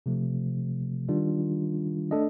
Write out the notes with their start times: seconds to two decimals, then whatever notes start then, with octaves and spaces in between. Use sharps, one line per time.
0.06 C3 F3 A3
1.09 D#3 G3 D4 F4
2.11 A3 D4 A4 D#5